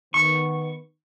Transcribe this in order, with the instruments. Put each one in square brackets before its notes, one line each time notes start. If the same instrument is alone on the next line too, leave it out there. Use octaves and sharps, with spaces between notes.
[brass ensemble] D#3 B3 [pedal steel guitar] C#6